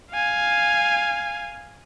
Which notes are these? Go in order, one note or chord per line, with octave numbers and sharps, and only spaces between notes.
F5 G#5